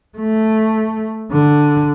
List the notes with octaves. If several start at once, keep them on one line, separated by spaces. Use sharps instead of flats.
A3
D3